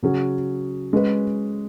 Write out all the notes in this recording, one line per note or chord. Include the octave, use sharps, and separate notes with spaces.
C#3 F#3 C#4 G#4
G#3 C#4 G#4 B4